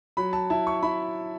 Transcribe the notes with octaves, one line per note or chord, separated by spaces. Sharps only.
F#3 B5
A5
E4 A5
C#6
E4 B5